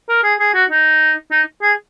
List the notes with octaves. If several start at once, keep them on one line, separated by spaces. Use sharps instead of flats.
A#4
G#4
G#4
F#4
D#4
D#4
G#4